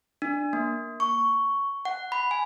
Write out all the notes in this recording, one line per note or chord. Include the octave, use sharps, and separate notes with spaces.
D4
A#3
C#6
F#5
B5
G#5